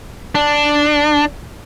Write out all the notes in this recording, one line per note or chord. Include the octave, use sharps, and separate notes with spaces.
D4